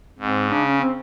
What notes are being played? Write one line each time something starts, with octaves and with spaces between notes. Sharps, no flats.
G#2 C4
C#3 D4
C#4
C4